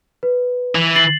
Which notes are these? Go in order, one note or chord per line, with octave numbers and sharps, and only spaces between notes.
B4
E3
A6 C7 F#7